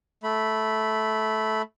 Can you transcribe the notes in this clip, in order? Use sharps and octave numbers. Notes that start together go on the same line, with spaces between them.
A3 B5